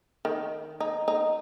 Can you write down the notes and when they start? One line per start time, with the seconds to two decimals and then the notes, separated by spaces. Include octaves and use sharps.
0.25 D#3
0.80 D#4
1.08 D#4